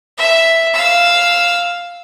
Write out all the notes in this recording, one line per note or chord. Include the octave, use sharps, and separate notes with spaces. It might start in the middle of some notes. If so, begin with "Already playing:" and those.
E5
F5 E6